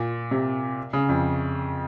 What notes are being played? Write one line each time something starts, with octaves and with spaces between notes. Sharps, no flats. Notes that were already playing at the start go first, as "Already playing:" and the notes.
Already playing: A#2
C3
C#3
F2